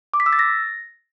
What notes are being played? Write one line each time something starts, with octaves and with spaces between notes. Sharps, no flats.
D6
B6
E6
A6
A#6